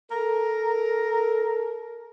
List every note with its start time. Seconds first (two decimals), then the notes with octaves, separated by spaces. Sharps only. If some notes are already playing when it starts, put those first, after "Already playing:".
0.11 A4 A#4